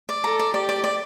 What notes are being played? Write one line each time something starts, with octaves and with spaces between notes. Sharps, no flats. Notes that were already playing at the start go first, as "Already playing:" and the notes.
D5
A4 A#5
D5
G4 D5
D5
D5